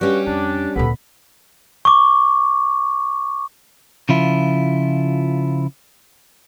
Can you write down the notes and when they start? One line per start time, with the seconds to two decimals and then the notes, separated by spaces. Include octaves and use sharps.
0.01 G2 G3 C#4 F#4 G4
0.27 F2 D4
0.76 D2 A#2 B3 A4 B5
1.85 C#6 D6
4.09 C#3 F3 E4 F4